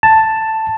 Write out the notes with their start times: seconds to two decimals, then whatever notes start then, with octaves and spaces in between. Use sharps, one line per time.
0.03 A5